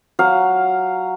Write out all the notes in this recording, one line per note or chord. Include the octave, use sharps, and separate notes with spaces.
F#3 F5 F#5